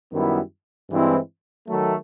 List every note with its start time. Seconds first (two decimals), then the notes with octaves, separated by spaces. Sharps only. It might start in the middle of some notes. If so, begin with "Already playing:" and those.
0.12 F#2 D#3 G3 B3 E4
0.90 G2 E3 G#3 C4 E4
1.68 D#3 F#3 A3